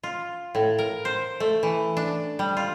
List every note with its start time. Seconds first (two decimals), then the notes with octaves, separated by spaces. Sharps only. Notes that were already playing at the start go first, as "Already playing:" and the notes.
0.03 F4
0.55 A2
0.79 A#4
1.05 C5
1.40 A3
1.63 E3
1.97 D4
2.39 G3
2.57 F4